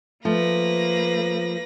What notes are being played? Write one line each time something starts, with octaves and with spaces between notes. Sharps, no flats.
F3 A3 A#3 B4 A#6